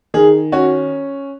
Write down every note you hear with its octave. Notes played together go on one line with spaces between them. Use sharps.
D#3 G#4
C#4 F#4